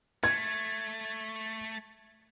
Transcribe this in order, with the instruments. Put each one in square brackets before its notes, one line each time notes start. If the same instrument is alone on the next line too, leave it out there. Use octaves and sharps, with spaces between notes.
[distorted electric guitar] A3 [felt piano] G#6